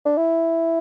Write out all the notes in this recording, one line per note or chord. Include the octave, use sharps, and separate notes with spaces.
D4
E4